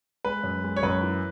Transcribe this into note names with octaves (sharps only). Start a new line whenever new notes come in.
G#3 B4
F#2
G#3
C#5
F#2 B4
E3